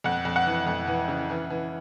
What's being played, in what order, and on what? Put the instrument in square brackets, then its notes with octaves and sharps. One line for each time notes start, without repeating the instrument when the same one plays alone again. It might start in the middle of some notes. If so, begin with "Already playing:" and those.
[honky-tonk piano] F2 F#5
F2
F#5
E3
F2
E3
C#3
E3
E3